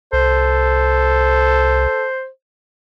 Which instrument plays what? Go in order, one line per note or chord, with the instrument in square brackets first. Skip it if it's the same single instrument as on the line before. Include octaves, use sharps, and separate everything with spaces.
[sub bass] C2 [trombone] A4 [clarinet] C5